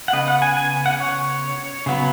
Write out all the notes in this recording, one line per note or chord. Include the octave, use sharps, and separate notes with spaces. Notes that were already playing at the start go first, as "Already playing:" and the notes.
F#5
C#3 B3 D#5
F#5
G#5
G#5
F#5
C#5
C#3 F#3 B3